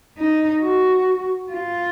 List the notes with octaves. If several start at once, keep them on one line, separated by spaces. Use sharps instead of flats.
D#4
F#4
F4